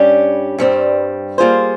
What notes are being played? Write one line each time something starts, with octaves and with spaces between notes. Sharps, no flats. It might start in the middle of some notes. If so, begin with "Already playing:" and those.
Already playing: G2 G3 C#4 G4
G2 G3 C4
G3 A#3 F4 G#4 C5